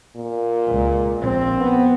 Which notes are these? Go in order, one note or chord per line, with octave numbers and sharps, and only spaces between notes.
A#2
C#2
A#1 C4
B3